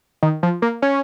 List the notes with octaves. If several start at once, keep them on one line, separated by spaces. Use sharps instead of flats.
D#3
F3
A#3
C#4